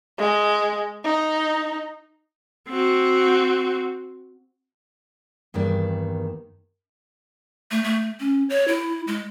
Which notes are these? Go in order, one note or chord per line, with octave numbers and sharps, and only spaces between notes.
G#3
D#4
C4 F#4
E2 G2 D#3 A#3 D5
A3
A3
C#4
C#5
E4
G#3